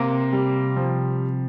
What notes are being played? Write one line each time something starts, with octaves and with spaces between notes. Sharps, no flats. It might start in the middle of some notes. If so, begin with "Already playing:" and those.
Already playing: C3 A#3 C4
G3
F3